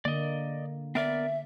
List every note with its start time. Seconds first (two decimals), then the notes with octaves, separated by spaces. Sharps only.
0.05 D3 A#3 D5 D#5
0.95 B3 A#4 D5 E5